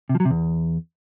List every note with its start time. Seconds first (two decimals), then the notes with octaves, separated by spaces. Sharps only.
0.09 C3
0.15 F3
0.20 F#3
0.25 C3
0.30 E2